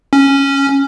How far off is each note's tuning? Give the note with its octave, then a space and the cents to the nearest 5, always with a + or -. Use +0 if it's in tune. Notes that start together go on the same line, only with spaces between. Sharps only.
C#4 -5